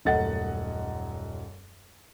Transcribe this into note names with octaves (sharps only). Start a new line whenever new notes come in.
D#1 F#2 A3 D#5 F#5 A6